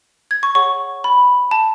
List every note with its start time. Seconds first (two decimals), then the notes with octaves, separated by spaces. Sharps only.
0.31 G#6
0.43 C#6
0.55 G#4 C#5 F#5 C#6
1.04 B5
1.51 A5